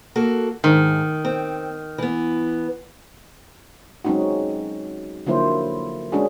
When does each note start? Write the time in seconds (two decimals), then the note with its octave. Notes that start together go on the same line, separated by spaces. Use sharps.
0.16 A#3 F#4 A4
0.64 G#2 D#3
1.25 C4
1.98 E3 B3
4.05 F#3 G#3 C4 C#4 D#4 F#4
5.27 D3 F3 F#3 A#3 E4 C5
6.12 G#3 C#4 D4 F#4 G#4